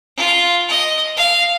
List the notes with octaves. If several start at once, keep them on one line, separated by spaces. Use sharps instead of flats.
F4
D#5
F5